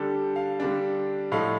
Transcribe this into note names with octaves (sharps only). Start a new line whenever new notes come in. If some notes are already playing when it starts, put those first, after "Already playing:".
Already playing: D3 G3 D4 A4
F5
D3 G3 D4
A2 F3 A3 D#4 F5